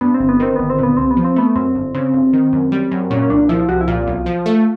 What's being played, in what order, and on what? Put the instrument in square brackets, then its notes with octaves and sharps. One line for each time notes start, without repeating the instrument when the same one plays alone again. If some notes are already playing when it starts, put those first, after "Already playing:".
[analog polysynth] G2 [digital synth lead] B3
[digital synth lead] C4
[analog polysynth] G1
[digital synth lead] B3
[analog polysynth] D#3 [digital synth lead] C4
[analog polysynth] G1 [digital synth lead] B3
[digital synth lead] C4
[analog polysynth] A#2
[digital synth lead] B3
[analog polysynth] C2 [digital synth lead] C4
[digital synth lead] B3
[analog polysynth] F3
[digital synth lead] C4
[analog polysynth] A3 [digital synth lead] B3
[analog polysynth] F#2 [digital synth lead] C4
[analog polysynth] G1
[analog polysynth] C#3 [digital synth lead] C4
[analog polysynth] G1
D#3
F#2
G3
F#2
[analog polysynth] A#2 [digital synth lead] C#4
[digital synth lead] C#4
[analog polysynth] C2 [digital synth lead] D4
[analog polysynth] F3 [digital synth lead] E4
[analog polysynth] C2 [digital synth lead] F#4
[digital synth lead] E4
[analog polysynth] A#2 [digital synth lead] F4
[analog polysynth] B1
F3
A3